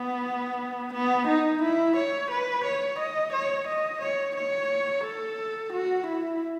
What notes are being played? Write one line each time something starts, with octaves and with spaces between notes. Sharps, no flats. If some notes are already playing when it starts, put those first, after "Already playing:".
Already playing: B3
B3
D#4
E4
C#5
B4
C#5
D#5
C#5
D#5
C#5
C#5
A4
F#4
E4